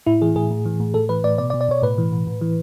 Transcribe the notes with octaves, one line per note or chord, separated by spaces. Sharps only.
A2 E4
E3 G#4
A2 G#4
A2
E3
A2
A2 A4
E3 B4
A2 D5
B2 D5
D5
B2
D5
B2 C#5
A2 B4
E3
A2
A2
E3